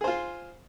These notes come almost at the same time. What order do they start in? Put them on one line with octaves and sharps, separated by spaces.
G#4 C5 F4